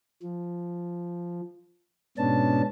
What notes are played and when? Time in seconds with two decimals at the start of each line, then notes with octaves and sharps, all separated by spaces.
0.22 F3
2.18 G#2 B2 B3 C#4 D4 A5